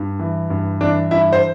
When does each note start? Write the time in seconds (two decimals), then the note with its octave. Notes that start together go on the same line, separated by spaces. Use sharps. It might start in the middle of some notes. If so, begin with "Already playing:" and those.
Already playing: G2
0.19 E3
0.50 G2
0.81 E3 D4 D5
1.11 G2 E4 E5
1.33 C5